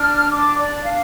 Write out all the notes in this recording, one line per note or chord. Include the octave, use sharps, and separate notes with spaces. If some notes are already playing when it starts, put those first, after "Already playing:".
Already playing: D4 F6
D4 D6
D5
D4
F5